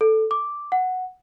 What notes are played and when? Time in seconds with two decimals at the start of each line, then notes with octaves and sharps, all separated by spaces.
0.01 A4
0.31 D6
0.72 F#5